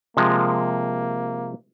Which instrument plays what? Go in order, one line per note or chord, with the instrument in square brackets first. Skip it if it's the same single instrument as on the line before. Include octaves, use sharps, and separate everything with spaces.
[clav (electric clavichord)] C3 F3 G#3 [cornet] A#3